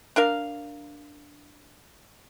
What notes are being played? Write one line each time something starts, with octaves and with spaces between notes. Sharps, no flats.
D4 A#4 F5